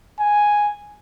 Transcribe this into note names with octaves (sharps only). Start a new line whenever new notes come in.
G#5